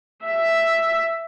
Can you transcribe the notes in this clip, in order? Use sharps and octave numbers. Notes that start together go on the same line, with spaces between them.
E5